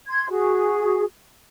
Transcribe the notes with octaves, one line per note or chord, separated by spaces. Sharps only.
C6 G#6
F#4 G#4